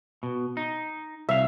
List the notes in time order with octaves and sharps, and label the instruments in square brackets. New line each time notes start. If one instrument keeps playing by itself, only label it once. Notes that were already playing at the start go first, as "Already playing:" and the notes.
[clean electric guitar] B2
D#4
[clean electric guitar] C2 F5 [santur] E5